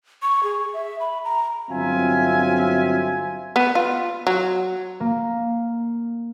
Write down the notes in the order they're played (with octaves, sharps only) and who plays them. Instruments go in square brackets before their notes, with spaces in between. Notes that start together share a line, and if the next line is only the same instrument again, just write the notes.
[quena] C#6
G#4
E5
B5
A#5
[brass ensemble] G1 F#3 C4 F4 E5 G#5
[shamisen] B3
F4
F#3
[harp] A#3